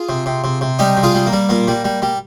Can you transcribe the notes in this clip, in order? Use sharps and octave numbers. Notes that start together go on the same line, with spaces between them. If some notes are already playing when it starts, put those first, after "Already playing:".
Already playing: F4 G#4
C3
C3
C3
C3
G3 D#4 G4
C3
F4 G#4
G3
A#3
G3
A#2 A#3
G3
G3
G3